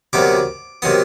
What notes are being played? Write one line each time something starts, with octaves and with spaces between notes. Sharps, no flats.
D2 C3 D#3 F#3 B3 D6
C3 D#3 F#3 B3 D#6